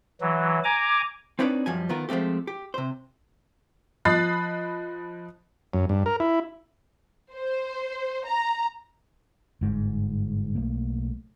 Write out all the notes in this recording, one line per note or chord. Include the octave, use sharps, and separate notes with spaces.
E3 F#3
G#5 A#5 D6
C4 D4 D#4 B4 C#5 D5
F#2 F3 G3 G#5
D#3 B3 F4 A#4
F3 G#3 A3 C4 G4
G4
C3 C5
F3 D#5 B5 F#6 A6 C7
F#2
G2
A#4
E4
C5
A#5
G1 G#2
B1 A3 A#3